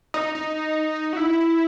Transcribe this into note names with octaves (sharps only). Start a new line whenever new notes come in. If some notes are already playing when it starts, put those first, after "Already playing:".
D#4
D#4
F#4
E4